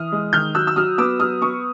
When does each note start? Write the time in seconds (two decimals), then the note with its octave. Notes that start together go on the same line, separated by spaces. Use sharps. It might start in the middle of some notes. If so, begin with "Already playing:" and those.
Already playing: E3 D#6 F6
0.12 G#3
0.33 D#3 F6 G6
0.55 F#3 E6 F#6
0.67 E6
0.76 F#3 D#6 F6
0.98 B3 D6 E6
1.20 F#3 D#6 F6
1.41 B3 C#6 D#6